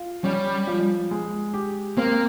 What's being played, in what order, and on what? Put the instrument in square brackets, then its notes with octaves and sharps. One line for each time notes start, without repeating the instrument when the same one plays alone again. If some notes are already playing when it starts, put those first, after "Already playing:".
Already playing: [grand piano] F4
[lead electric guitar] G3 [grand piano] C#4
[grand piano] F3
G#3
G4
[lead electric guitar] A#3 [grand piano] C4